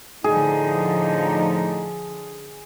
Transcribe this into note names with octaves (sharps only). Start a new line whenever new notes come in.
A2 D3 F3 D#4 G#4